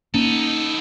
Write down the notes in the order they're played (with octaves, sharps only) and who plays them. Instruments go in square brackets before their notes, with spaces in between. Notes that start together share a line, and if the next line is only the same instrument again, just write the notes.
[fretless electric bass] A#3 C#4 [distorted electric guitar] B3 A4 [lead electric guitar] D#4